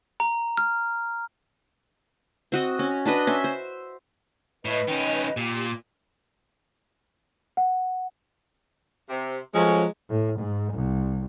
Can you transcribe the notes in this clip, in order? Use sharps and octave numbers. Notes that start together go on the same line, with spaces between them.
A#5
F6
C4 F#4 D#5
C#4
D4 F#4 B4 D#5
C#4 E5 C6
C5
A2 B4 D#5
D#3 C#4
A#2 G4
F#5
C3
F3 F#3 G#3 A3 C#4
A2
G#2
C2